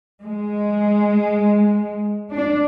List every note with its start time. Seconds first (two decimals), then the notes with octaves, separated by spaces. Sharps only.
0.24 G#3
2.34 D4